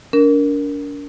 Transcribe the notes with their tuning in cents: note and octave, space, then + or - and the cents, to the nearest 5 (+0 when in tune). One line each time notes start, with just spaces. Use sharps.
D4 -40 A#4 +0